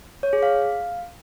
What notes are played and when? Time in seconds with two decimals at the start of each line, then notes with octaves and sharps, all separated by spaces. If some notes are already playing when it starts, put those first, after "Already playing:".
0.23 C#5
0.33 G#4
0.43 F5